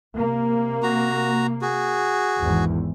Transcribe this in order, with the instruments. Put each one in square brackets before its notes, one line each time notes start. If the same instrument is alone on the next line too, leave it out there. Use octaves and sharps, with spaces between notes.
[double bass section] C3 A#3
[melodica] F#4 A#5
F#4 G#4
[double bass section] G#1 E2